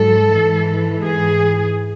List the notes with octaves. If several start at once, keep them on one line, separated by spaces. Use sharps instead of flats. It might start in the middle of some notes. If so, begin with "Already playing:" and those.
Already playing: G#2 F#3 A4
G#2 E3
G#4